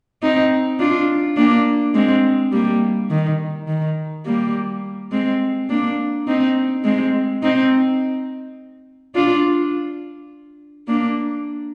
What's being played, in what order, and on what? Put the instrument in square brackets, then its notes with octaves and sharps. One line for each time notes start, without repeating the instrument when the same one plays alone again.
[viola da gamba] C4 D#4
D4 F4
A#3 D4
G#3 C4
G3 A#3
D#3
D#3
G3 A#3
G#3 C4
A#3 D4
C4 D#4
G#3 C4
C4 D#4
D4 F4
A#3 D4